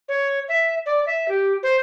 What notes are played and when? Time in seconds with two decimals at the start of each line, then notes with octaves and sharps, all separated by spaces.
0.09 C#5
0.48 E5
0.86 D5
1.06 E5
1.28 G4
1.63 C5